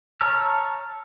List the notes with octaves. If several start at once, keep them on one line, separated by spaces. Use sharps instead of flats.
C#5 A5 A#5 E6 F6